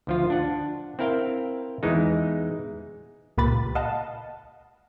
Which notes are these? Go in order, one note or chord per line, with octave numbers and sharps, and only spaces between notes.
D2 F3 F4
D4 F#5
C4 E4 A#4 F5 G5
E2 E3 G#3 D#4
C#2 A#2 G4 B4 B5 A6
D#5 F5 F#5 A5